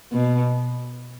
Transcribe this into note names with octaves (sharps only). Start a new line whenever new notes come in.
B2